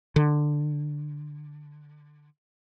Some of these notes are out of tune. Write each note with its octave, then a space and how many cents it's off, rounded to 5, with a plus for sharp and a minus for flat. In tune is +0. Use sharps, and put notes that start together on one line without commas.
D3 +10